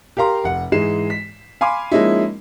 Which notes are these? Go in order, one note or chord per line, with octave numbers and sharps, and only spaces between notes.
G4 A#4 F5 A#5 C6
F1 F#5
G#2 E3 G#3 C7 E7
B6
F5 G#5 B5 C6 D6
F3 G#3 A#3 C#4 D#4 E4